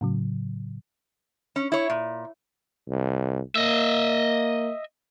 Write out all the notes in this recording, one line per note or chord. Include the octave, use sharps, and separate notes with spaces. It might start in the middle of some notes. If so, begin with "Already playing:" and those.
A2 C#3 F#3
C#4
E4 C#5
A#2
C2
A#3 D#5 E5